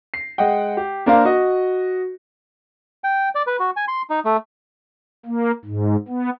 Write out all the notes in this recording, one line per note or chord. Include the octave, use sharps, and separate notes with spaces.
C7
G#3 D#5 F#5 G5
G4
A#3 D4 A#4 C5 F5
F#4 D#5
G5
D5
B4
F#4
G#5
C6
D#4
A3
A#3
G#2
B3